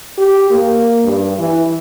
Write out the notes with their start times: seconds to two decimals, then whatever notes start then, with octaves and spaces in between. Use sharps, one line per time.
0.18 G4
0.51 A#3
1.05 G2
1.39 E3